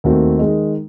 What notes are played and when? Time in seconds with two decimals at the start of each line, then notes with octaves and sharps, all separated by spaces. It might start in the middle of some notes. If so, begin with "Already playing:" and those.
0.04 D#2 D#3 A3 C4 F#4
0.39 D#3 G#3 D#4